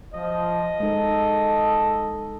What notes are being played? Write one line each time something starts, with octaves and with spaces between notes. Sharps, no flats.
F3 D#5
G#3 D#4 A4